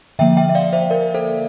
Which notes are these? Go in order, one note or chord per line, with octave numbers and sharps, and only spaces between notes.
D3 F3 A#3 E5 G5
E5 G5
E5
D5 F5
C5 E5
A#4 D5
A4 C5